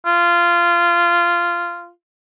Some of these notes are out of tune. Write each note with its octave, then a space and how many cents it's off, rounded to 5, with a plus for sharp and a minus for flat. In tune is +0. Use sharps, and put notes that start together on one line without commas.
F4 -15